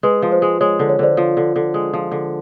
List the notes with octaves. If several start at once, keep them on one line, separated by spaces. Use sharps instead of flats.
G#3 B4
F3
C5
G#3
G#3 C#5
D3
C#5
D3 C5 D5
F3
D3
D3
G#3
F3
D3